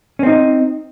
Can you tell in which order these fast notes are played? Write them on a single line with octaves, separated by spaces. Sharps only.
C#4 C4 D#4